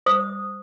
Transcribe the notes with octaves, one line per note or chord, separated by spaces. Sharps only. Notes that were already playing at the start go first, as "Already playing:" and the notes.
C5 D#6